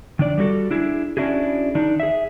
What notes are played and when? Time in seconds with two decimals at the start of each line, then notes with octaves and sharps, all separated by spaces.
0.19 D#3 D4 D5
0.38 G3 A3 F#4 A4
0.71 D4 E4 G#4
1.17 C#4 D4 E4 F#4 G#4
1.75 D#3 D4 D#4
2.00 G#4 E5